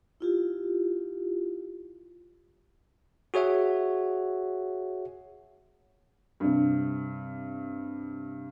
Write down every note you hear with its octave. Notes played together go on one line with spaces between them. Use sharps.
E4 F4 G4
F#4 G#4 C#5 E5 F#5
G2 C3